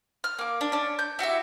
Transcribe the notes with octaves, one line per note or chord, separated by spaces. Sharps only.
F6
A#3 D6
D4
C#4 D4
G6
E4 F#4 G4 E5